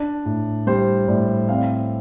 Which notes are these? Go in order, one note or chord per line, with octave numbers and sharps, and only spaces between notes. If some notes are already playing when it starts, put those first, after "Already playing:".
Already playing: D4 D5
A2
G3 C5
A2 D5
C4 F5